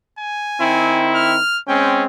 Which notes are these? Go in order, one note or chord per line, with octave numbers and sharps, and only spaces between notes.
G#5
D#3 C4 E4
F6
G#3 C4 C#4 G5